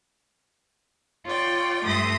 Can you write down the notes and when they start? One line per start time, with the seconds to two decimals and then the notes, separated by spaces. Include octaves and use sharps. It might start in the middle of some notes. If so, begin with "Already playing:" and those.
1.25 F4 C#5 D5 G5
1.84 G2 A3 E5 C6 D#6 A#6